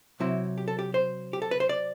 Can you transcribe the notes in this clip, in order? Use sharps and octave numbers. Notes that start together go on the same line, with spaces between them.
C3 F#3 C4 E4
G4
A4
G4
C5
G4
A4
B4
C5
D5